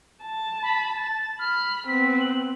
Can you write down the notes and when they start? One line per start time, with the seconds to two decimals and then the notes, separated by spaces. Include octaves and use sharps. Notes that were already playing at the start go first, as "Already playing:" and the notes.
0.24 A5
0.62 B5
0.96 A6
1.39 B5 F6
1.87 B3 C4 B6
2.20 F#7